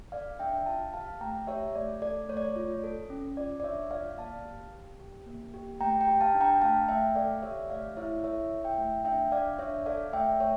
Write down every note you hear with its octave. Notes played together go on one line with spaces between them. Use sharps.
A4 D5 F5
D4 E5 G5
F4 F5 A5
G4 F5 A5
A3 G5 A#5
G4 C#5 E5
A3 D5
A4 D5
A3 C#5
D5
C#5
F4
A4
C#4
F4 D5
D5
D4 C#5 E5
F4 D5 F5
A#3 F5 A5
G4
G4
G4
A#3
G4
A3 G5 A#5
G5 A#5
G4
F5 A5
D4
G5 A#5
A3 F5 A5
A3 E5 G5
A4 D5 F5
G4 C#5 E5
A3 D5 F5
E4 C#5 E5
A4 C#5 E5
E4
E5 G5
A3
D4 E5 G5
D4 D5 F5
D4 C#5 E5
A4 D5 F5
A3 E5 G5
A3 C#5 E5